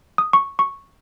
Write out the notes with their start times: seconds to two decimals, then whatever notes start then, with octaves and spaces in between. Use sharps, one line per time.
0.18 D#6
0.33 C#6
0.59 C#6